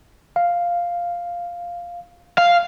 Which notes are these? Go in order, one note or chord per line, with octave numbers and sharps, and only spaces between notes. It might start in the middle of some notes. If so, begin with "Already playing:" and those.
F5
F5